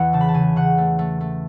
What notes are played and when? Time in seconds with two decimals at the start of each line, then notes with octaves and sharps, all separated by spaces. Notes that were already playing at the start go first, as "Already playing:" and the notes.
Already playing: E2 E3 F#5
0.13 C#3 A5
0.21 B5
0.28 A5
0.34 C#3 G#5
0.56 C#3 F#5
0.78 A3
0.99 A3
1.21 A3